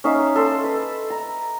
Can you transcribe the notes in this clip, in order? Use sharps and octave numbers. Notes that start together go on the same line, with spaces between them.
C#4 D#4 E5 F5
A4 C6 E6
B4
A#5